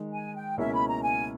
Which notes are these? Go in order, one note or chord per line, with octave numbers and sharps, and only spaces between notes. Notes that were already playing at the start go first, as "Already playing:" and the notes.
Already playing: D#3 G#3 D#4
G#5
G5
C#2 B2 A#3 C#4 E4 E5
B5
A#5
G#5